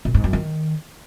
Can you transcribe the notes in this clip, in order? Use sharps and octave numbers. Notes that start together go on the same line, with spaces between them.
A#2
G#2
F#2
D#3